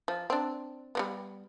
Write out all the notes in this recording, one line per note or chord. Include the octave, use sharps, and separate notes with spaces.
F3
C4 D4
G3 G#3 B3